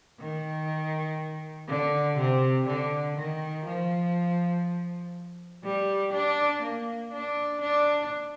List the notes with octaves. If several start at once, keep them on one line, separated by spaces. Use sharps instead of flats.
D#3
D3
C3
D3
D#3
F3
G3
D4
A#3
D4
D4